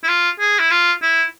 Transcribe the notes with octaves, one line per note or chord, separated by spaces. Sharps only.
E4
F4
G#4
E4
F4
E4